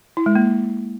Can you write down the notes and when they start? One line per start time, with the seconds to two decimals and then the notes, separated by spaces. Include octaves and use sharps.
0.17 E4
0.26 G#3
0.35 A#3